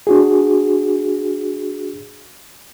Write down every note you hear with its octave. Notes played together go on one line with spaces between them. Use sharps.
D4 F#4 G#4